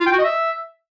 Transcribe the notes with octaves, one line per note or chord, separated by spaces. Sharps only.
F4
G5
F#4
D#5
E5